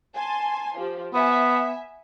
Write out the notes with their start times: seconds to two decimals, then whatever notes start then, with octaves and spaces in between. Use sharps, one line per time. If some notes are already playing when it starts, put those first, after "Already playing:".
0.14 G#5 A5 C6
0.75 F3 G4
1.14 B3 E5 G#5